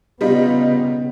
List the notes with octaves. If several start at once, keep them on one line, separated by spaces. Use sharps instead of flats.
C#3 G3 B3 D#4 F4